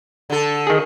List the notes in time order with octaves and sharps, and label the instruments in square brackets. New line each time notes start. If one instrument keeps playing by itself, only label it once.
[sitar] D3 A4
[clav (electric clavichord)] D#3 G#4